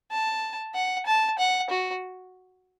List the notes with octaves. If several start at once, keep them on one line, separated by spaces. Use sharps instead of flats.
A5
F#5
A5
F#5
F#4